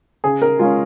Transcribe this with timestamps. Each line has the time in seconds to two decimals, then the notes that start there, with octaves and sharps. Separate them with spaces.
0.24 C#3 G#4
0.42 A#4
0.59 G#3 C#4 F4